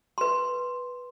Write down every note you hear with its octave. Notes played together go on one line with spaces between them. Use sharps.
B4 C6